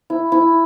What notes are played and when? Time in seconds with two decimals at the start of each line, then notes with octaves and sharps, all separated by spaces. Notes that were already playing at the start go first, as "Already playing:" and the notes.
0.10 E4
0.32 E4